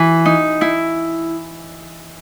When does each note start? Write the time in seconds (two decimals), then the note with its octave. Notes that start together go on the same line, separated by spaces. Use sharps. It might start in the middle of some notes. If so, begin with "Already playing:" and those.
Already playing: E3
0.25 D#4
0.61 E4